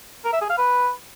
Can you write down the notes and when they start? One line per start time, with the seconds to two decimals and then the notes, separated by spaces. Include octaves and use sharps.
0.25 A#4
0.33 E5
0.41 G#4
0.50 F5
0.58 B4